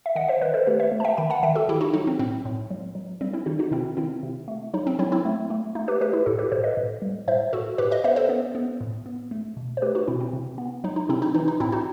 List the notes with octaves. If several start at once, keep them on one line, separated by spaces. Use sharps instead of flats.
E5
D#3 D#5 F#5
C5 E5
D#3 B4 D#5
A4 C5
A3 G4 B4
C5 E5
A3
A5
E5 G5
D#3 G5 B5
F#5 A5
D#3 E5 G5
F#4 A4
D#3 E4 G4
D#4 F#4
F#3 D#4
C4
A2 C4
A2
F#3
F#3
G3 C4
C4 E4
D#3 D#4 F#4
D#4 F#4
C3 C4 E4
D#3 C4 E4
C3
A3
F#3 D#4
C4
F#3 C4 E4
C4 E4
A3
A3
A3 D#4
G4 B4
A3 G4 B4
E4 G4
A2 F#4 A4
G4 B4
A2 A4 C5
B4 D#5
A2
G3
A2 C5 E5
A2 F#4 A4
A2 G4 B4
B4 D#5
B3 C5 E5
B4
A4 C5
B3
B3
A2
B3
A3
B2
C5
A3 G4 B4
D#4 F#4
B2 C4 E4
C4
C3
B3
F#3 D#4
D#4
C3 C4 E4
D#4
E3 D#4
D#4
A2 C4 E4
D#4 F#4